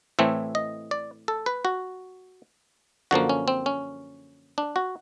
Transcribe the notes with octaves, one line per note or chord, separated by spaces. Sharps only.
A2 E3 A3 C4 E5
D#5
D5
A4
B4
F#4
F#2 D3 F3 A#3 F#4
C#4
C4
C#4
D4
F#4